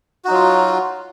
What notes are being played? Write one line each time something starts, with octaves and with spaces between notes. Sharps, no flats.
F#3 D#4 F4 F#4